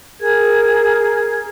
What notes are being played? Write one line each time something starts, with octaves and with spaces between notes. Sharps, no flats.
G#4 A#4 G#6